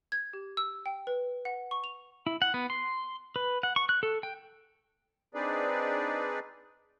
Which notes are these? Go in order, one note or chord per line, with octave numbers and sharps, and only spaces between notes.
G#6
G4
E6
G5
B4
F#5
C#6
F7
E4
F#5
B3
C6
B4
F#5
C#6
F#6
A4
G5
C4 D4 D#4 G#4 B4 D5